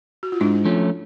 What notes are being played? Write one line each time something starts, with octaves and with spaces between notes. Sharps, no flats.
F#4
F4
G#2 D4 E4
F3 A3 C#4